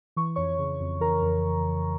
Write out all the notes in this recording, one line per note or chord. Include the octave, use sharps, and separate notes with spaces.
E3 C#6
F2 C#5 C#6
C#3
F2
E3 A#4 A#5
F2